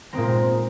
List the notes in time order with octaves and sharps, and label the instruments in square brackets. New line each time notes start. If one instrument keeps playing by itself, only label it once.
[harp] A#2 G#3 C4 A#5